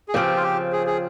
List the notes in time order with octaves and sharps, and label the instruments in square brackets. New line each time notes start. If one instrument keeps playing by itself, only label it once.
[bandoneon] G#4
[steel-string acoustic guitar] C#3 F3 C4 [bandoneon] G4
[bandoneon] F4
G4
G#4
G#4